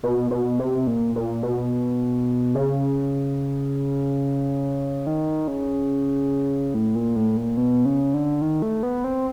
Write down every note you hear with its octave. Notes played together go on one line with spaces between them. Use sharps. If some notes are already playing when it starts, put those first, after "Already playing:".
B2
B2
C3
A#2
A#2
B2
C#3
D#3
C#3
A2
A#2
A2
A#2
B2
C#3
D3
D#3
A3
B3
C4